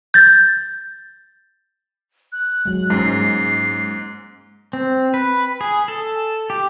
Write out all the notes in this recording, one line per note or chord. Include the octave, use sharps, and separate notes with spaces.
G6 A6
F#6
F#3 G#3
G#2 G#3 A#3 C#4 C7
C4
B4
G#4
A4
G4